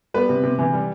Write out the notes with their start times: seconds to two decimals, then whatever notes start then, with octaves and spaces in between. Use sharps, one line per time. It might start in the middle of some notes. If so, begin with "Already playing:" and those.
0.14 G3 B3 B4
0.29 C3
0.44 C3
0.59 E3
0.73 G3